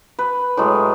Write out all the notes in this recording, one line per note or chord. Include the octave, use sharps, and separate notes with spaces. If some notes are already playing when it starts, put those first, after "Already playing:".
B4
A2 F#3 G#3